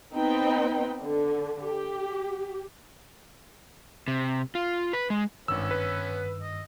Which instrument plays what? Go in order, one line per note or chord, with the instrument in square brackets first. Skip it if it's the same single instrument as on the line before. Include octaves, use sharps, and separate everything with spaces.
[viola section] B3 C4 D#4 B4 G5
D3
G4
[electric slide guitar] C3
F4
B4
G#3
[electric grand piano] G#1 E6 [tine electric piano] G2 D#3 [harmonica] B3 C#4
[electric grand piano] B4
[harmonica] D#5